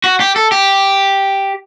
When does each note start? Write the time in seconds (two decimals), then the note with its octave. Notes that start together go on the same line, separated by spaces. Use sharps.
0.04 F#4
0.20 G4
0.36 A4
0.52 G4